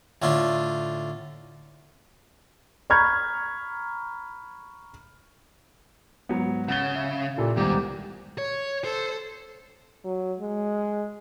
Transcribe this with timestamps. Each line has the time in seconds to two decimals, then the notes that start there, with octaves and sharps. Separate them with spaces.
0.22 A2 D3 A3 F4
2.90 A#5 B5 C#6 F6 G6 G#6
6.29 G#2 F#3 B3
6.68 C#3 F#5 A6 G7
6.95 E5
7.37 A#2 E4 G4 A4
7.57 C2 G#2 D#3 B3 G4
8.38 C#5
8.84 A4 C5
10.04 F#3
10.40 G#3